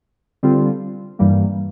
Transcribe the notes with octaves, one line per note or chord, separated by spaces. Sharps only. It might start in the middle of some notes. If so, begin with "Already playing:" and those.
D3 G3 C4 F4
G2 E3 G3 A#3